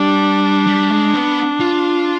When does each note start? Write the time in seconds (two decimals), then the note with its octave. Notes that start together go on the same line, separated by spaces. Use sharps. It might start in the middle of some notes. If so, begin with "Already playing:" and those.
Already playing: G3 D4
0.67 G3
0.90 G#3
1.14 B3
1.61 F4